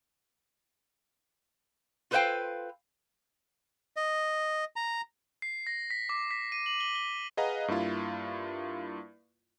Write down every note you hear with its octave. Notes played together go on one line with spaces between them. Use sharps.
F4 A4 B4 C5 F5 G5
D#5
A#5
C7
A#6
B6
D6
B6
D#7
F#7
G7
G7
G#4 B4 D#5 F5 F#5 A#5
G2 A#3 E4 F4